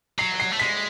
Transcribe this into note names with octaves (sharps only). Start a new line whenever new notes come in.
F#3 C7
C7
A3
G#3 B6